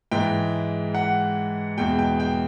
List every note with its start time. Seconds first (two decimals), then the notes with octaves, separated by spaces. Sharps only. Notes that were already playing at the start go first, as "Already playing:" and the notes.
0.11 G#2 E3 G#3 G5
0.94 F#5
1.77 E2 B2 G#3 G5
1.99 G5
2.20 G5